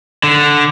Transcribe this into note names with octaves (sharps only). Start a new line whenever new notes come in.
D3